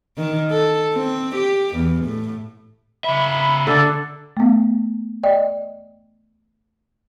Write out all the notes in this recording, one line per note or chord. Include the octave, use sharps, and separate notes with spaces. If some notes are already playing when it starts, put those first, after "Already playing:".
D#3
A4
C4
G4
E2
A2
C#3 E5 B5
D3 D4 A4
A3 B3
D5 D#5 G5